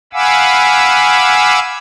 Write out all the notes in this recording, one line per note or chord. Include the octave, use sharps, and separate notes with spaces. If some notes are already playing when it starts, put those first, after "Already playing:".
F5 F#5 G#5 B5 D6 E6